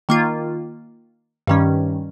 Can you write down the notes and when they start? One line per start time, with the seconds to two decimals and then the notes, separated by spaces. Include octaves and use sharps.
0.09 D#3 A#3 F4
1.47 G2 D#3 G3 C#4